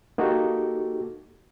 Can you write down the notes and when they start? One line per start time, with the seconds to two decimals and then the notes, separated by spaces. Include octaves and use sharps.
0.18 A#3 D#4 F#4 G4 A4